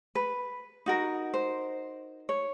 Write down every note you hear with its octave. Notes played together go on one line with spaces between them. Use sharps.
B4
D#4 F#4 A#4
C5
C#5